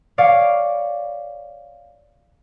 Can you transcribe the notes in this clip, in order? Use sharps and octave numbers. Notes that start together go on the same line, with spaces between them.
C#5 D5 F5